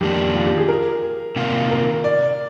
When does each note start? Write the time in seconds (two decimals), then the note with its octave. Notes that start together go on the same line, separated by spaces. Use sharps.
0.01 F2 D#3 A#3 D4 G4
0.35 F4
0.47 G4
0.58 G#4
0.68 A#4
1.36 C3 D#3 A#3 F4
1.71 A#4
2.04 D5